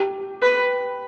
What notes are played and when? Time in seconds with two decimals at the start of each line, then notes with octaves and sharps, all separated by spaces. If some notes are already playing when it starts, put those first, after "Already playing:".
Already playing: G4
0.42 B4